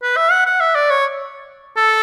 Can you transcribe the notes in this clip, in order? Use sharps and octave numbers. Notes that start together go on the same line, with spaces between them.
B4
E5
F#5
F#5
E5
D5
C#5
A4